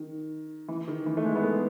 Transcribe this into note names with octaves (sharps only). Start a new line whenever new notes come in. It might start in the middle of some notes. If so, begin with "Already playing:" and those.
Already playing: D#3
E3
D#3
E3
A3
G#3
B3
A3